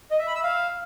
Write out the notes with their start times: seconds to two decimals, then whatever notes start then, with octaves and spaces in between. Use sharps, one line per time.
0.11 D#5
0.19 E5
0.27 B5
0.35 E6
0.43 F5